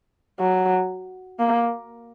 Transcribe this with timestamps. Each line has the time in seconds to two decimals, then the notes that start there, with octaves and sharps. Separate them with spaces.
0.40 F#3
1.39 A#3